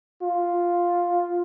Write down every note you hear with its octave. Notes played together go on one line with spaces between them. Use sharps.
F4